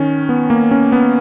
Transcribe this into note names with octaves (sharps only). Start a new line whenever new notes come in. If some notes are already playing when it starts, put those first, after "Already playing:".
Already playing: D#3 C#4
B3
A#3
C#4
B3